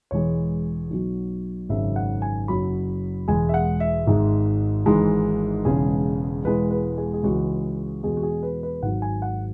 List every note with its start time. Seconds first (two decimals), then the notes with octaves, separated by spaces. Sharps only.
0.11 E1 E2 E3 G#3 C#5
0.90 B1 B2 F#3
1.69 G#1 F#2 C#3 E5
1.96 F#5
2.22 G#5
2.48 F#1 F#2 F#3 B5
3.28 E1 E2 E3 G#3 G#5
3.49 E5
3.54 F#5
3.80 E5
4.07 G#1 G#2 G#3
4.86 G#1 G#2 E3 G#3
5.65 E1 E2 C#3 G#3 G#4
6.44 E1 E2 E3 G#3 B4
6.71 B4
6.98 G#4
7.14 G#4
7.23 C#2 C#3 E3 G#3 F#4
8.03 E2 B2 G#3 G#4
8.17 F#4
8.23 G#4
8.43 B4
8.63 B4
8.82 G#1 G#2 F#3 F#5
9.02 G#5
9.22 F#5